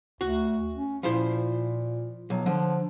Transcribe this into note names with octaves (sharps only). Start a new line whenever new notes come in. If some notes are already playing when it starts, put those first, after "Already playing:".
D2 F#4
C#4
A#2 F3 E4 C5
B1 F#3
D3 F3